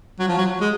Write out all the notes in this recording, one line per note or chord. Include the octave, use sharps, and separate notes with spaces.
F#3
F3
F#3
G#3